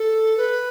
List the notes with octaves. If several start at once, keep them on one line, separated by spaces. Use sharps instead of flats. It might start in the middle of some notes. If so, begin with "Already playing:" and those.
Already playing: A4
B4